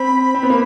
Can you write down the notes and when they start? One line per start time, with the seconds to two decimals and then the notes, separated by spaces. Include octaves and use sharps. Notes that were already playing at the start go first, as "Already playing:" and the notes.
Already playing: C4 B5
0.34 C4
0.43 B3
0.50 A#3